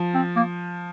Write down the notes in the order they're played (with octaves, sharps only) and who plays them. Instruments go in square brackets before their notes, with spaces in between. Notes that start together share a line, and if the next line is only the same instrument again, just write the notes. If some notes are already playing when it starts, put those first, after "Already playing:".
Already playing: [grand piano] F3
[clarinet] C4
A#3